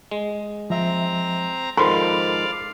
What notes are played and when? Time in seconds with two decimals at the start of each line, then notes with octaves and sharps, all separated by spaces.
0.11 G#3
0.70 F3 C4 E5 A#5
1.77 G#2 D#3 F3 A4 D5 F5 B5 C6